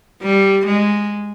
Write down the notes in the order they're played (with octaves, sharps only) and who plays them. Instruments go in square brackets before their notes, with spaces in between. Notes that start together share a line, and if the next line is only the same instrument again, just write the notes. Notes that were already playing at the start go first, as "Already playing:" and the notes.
[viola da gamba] G3
G#3